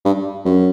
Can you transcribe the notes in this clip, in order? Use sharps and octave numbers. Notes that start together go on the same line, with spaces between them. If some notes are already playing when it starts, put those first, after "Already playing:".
G2
F#2